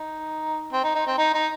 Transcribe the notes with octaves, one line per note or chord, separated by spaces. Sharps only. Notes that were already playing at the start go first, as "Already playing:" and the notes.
Already playing: D#4
C4
D#4
D#4
C4
D#4
D#4